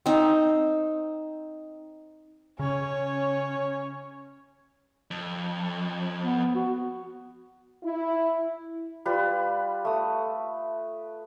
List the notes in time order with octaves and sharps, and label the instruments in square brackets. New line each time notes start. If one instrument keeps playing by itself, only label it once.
[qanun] C4 D#4
[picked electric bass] C#3 [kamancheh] C#4 C#5
[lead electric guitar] F2
[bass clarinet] B3
F#4
[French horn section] E4
[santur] G3 F4 B4
A3 D#6